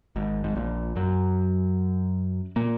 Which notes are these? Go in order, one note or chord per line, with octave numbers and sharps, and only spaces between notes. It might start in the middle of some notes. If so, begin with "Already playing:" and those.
G#1 G#2
G#2
A#1 A#2
F#2 F#3
A#2 A#3